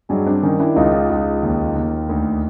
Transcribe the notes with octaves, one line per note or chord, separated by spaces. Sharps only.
G2 F#3 G#3
C4 D4
D#3 C#4 D#4
D4 E4
C#2 D#4 F4
C#2
D#2
D#2
D2